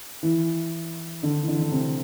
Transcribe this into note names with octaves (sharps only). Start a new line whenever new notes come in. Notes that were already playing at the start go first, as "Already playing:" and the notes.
E3
D3
E3
D3
D3
C3